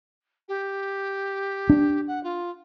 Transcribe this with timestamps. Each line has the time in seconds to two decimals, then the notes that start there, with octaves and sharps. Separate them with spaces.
0.48 G4
1.70 D4
2.07 F#5
2.23 F4